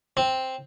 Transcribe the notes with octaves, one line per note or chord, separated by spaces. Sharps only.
C4